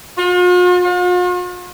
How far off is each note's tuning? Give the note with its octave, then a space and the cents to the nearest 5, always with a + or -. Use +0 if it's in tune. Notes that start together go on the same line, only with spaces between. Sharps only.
F4 +45
F4 +45